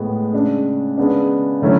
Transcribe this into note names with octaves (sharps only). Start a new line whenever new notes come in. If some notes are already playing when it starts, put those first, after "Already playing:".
Already playing: A2 G#3 B3
C#3 G#3 D4
C#3 G#3 B3 D4
D3 F#3 A3 C#4 E4